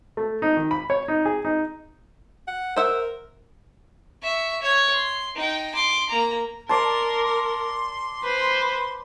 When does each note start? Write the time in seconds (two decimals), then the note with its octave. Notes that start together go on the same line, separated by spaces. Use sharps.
0.17 A3
0.42 D#4
0.57 D#3
0.71 B5
0.90 C#5
1.08 D#4
1.25 G#4
1.45 D#4
2.48 F#5
2.76 A#4 C5 E5 F#5
4.22 E5 C#6
4.62 C#5
4.93 C6
5.36 D#4 G5
5.75 C6 D6
6.10 A#3 A#5
6.69 A#4 D5 A5 C6
7.24 C6
8.23 B4 C5